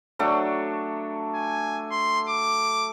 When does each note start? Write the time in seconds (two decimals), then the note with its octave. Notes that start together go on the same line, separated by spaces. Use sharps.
0.19 F#3 A3 D4
1.35 G#5
1.91 C6
2.29 D6